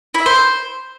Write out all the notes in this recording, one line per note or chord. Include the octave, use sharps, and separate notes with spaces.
E4
E5
C5